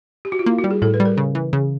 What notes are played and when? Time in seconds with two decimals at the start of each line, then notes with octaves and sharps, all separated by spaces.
0.25 G4
0.32 F#4
0.39 F4
0.46 A#3 E4
0.58 F#4
0.64 G3
0.71 G#4
0.82 A2 A4
0.94 B4
1.00 G3
1.05 A#4
1.17 C#3
1.35 E3
1.53 C#3